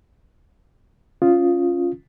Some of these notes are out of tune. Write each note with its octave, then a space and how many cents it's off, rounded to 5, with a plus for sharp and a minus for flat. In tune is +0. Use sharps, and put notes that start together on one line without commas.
C#4 +0 F4 +0 D#6 +0